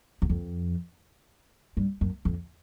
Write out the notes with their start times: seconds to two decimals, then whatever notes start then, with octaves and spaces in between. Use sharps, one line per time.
0.22 E2
0.29 F2
1.77 G2
2.01 F#2
2.25 F2